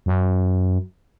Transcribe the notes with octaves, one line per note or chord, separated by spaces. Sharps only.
F#2